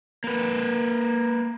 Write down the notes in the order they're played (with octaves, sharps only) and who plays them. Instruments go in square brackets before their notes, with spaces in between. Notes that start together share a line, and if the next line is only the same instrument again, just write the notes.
[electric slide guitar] A#3 B4